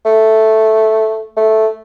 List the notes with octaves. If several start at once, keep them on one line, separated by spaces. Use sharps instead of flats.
A3
A3